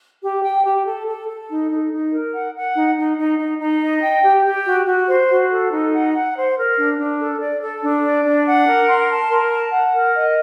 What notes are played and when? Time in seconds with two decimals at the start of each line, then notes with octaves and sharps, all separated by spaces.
0.22 G4
0.43 G5
0.64 G4
0.85 A4
1.07 A4
1.28 A4
1.49 D#4
1.70 D#4
1.91 D#4
2.12 A#4
2.33 F#5
2.55 F#5
2.76 D#4
2.97 D#4
3.18 D#4
3.39 D#4
3.60 D#4
3.81 D#5
4.02 G5
4.23 G4
4.45 G4
4.66 F#4
4.87 F#4
5.08 C5
5.29 F#4
5.50 A4
5.71 D#4
5.92 F#5
6.13 F#5
6.35 C5
6.56 A#4
6.77 D4
6.98 D4
7.19 A4
7.40 D5
7.61 A4
7.83 D4
8.03 D5
8.25 D4
8.46 F#5
8.67 A#4
8.88 C6
9.09 A5
9.30 A#4
9.51 A5
9.73 F#5
9.94 A#4
10.15 D#5